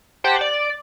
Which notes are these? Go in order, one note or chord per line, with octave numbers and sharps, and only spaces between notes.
G4 C5 F#5 G5 A5
D5